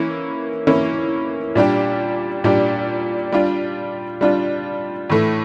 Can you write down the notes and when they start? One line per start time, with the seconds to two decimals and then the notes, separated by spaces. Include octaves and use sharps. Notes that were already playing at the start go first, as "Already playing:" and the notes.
Already playing: E3 A#3 C#4 E4
0.67 E3 A#3 C#4 E4
1.56 A#2 G3 D4 G4
2.44 A#2 G3 D4 G4
3.32 G3 D4 F4
4.21 G3 D4 F4
5.10 A2 E3 A3